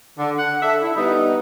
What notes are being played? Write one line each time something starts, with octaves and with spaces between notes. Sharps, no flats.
D3
F#5
D4 A4 E5
E4
G3 B3 D4 D#4